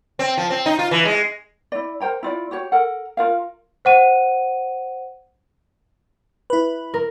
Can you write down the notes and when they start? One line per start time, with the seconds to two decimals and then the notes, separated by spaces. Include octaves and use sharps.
0.19 C4
0.38 F3
0.50 C4
0.66 D#4
0.79 F4
0.91 E3
1.05 G#3
1.72 E4 D5
2.00 A#4 C5 G5 A#5
2.23 E4 F4 D5
2.51 F#4 G4 C#5
2.72 A4 A#4 F#5
3.17 F4 A#4 F5
3.85 C5 F#5 D#7
6.50 E4 B4
6.94 A#4